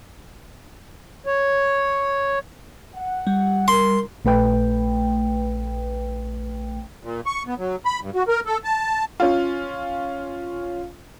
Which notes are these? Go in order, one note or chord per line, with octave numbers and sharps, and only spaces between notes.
C#5
F#5
G3
A#4 C6
A#1 A3 B4 G5
A#2
C#6
B3
F#3
B5
G2
F#4
A#4
A4
A5
C#4 F4